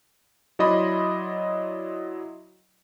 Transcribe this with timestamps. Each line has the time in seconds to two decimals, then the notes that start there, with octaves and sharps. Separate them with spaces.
0.59 F#3 E4 D5 D#5 B5 C6